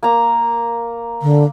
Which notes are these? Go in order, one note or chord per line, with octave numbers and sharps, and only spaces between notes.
A#3 A#5
D3